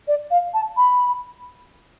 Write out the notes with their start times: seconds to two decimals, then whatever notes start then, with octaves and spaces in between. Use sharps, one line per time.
0.08 D5
0.31 F5
0.54 A5
0.77 B5